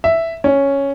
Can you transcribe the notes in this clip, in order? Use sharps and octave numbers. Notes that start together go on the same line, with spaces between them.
E5
C#4